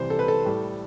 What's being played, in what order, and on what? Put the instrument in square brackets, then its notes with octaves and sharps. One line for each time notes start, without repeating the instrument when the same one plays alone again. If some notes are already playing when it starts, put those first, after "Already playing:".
Already playing: [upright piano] C2 C3 E3 G3 C5
A4
B4
A4
A2 G3